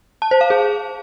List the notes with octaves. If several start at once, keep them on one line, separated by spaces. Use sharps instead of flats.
A5
C5
F5
G#4